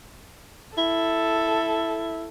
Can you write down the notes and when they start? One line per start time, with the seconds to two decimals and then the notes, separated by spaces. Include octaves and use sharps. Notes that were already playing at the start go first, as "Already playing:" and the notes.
0.78 E4 A4